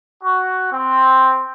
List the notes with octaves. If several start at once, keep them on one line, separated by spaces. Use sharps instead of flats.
F#4
C4